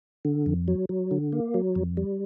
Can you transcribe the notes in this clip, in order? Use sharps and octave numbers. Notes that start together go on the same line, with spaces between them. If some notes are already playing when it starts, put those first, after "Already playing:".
D3
F2
F#3
F#3
D3
A#3
F#3
F2
G3